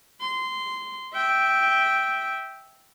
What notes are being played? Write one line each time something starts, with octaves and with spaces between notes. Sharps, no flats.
C6
E5 G5